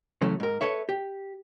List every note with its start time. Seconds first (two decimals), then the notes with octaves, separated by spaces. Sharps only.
0.21 C#3 E3 F#3 A3 C#4
0.40 G#2 A#4
0.61 A4 B4 C#5 E5
0.89 G4